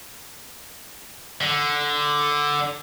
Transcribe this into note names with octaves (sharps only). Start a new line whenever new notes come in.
D3